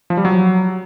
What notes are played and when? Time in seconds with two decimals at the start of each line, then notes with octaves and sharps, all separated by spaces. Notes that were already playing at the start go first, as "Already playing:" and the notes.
0.10 F3
0.17 G3
0.25 F#3